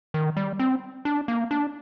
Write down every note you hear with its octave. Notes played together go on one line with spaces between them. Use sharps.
D#3
G3
C4
D4
A#3
D4